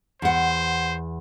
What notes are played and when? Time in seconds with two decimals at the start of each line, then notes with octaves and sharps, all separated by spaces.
0.22 E2 C5 F#5